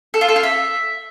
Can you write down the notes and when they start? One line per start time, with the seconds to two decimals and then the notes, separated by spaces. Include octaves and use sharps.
0.14 A4
0.21 F4
0.29 A4
0.36 F4
0.43 E5